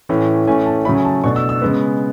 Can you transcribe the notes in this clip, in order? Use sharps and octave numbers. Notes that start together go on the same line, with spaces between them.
A2 E3 A3 C#4
A2 E3 A3 C#4 G#5
A5
C#3 F#3 A3 C#4 B5
G#5
A5
B2 A3 D4 C#6
E6
E6
C#3 G#3 B3